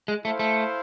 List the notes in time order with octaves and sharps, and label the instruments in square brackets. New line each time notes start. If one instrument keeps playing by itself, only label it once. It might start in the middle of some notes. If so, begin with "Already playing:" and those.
[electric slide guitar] G#3
[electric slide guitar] A3 [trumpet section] E4 A4 C5 F5
[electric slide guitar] A3